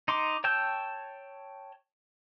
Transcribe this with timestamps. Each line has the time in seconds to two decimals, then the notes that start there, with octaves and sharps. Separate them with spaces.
0.08 D#4 C6 D6
0.44 C#5 G5 A5 E6 G6